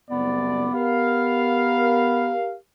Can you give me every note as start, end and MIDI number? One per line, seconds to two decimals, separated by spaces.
0.10 0.68 30
0.10 0.68 36
0.10 2.35 59
0.10 0.68 74
0.73 2.55 67
0.73 2.55 70
0.73 2.55 77